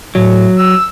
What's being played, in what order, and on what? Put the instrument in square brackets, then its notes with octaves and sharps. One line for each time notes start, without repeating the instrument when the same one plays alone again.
[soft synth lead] A2 [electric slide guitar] F#3
[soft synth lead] E6